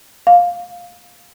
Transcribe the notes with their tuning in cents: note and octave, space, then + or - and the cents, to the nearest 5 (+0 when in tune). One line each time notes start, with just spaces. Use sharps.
F5 +10